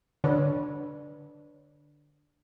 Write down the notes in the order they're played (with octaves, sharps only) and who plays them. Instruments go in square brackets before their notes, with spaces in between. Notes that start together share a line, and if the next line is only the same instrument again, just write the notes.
[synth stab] D3 [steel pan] D4 B4 C#5